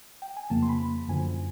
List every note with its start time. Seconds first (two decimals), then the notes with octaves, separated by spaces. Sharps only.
0.22 G5
0.37 G#5
0.50 F2 C#3 F3 A#3 A5
0.62 C6
0.69 B5
1.08 F#2 D3 F3 G#5